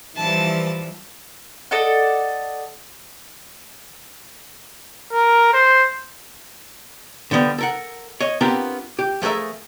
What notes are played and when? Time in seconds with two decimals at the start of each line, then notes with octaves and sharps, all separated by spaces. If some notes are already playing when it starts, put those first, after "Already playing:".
0.17 E3 F3 G3 A5
1.71 A4 D5 D#5 F#5
5.13 A#4
5.53 C5
7.31 D3 F3 G3 B3
7.58 A4 A#4 F#5
8.20 C#5 D#5
8.41 B3 C4 D4 F4 G4 A#4
8.99 G4
9.22 F3 A3 G#4 A#4 E5